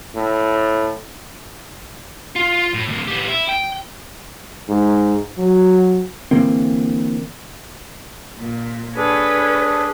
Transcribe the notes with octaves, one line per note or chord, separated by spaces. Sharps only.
A2
F4
A2
D2 A2
A2 G4
E4
G5
G#2
F#3
D3 E3 A#3 C4
A#2
D4 G#4 A4 B4 C#5